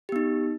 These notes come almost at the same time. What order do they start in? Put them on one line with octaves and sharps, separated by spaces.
G4 B3 D#4